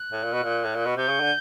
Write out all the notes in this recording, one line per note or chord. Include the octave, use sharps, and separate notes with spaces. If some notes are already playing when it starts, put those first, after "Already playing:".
Already playing: F#6
A2
A#2
B2
A#2
A2
A#2
B2
C3 G6
C#3
D3